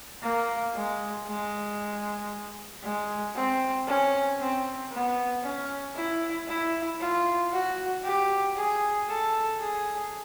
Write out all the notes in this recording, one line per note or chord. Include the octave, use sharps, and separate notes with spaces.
A#3
G#3
G#3
G#3
C4
C#4
C4
B3
C#4
E4
E4
F4
F#4
G4
G#4
A4
G#4